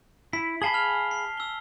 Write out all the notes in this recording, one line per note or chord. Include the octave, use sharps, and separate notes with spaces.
E4 B6
G#4 F5 G#5 A5 B5 G7
F6 F7
C7
E6 G7